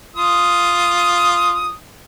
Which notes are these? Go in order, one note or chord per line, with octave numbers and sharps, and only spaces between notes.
F4 D#6